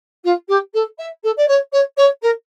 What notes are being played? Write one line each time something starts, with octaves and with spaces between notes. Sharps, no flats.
F4
G4
A4
E5
A4
D5
C#5
C#5
C#5
A#4